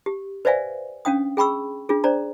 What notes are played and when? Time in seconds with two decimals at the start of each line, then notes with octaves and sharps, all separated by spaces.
0.06 G4
0.45 B4 C5 D5 E5 F5 G#5
1.05 C#4 D4 F5 G5 D#6
1.37 G#4 G5 B5 C#6 E6
1.89 D4 F4 G#4
2.04 D4 C5 D5 A#5